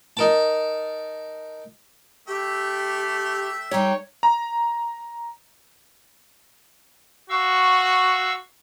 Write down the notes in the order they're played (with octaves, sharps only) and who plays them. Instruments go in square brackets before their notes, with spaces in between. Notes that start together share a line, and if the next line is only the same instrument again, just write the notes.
[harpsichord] D#4 A#4 A5
[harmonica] A3 E5 G5 [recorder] G4
[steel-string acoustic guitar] G3 G4 [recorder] D#4 [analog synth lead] C#5
[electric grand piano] A#5
[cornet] F#4 [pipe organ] F5 C#6 E6